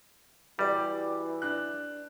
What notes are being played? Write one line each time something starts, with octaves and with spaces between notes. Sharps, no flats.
E3 G3 F#4 G4 D5
D4 F#6